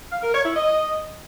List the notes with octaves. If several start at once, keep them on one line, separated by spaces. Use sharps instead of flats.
F5
A#4
C#5
E4
D#5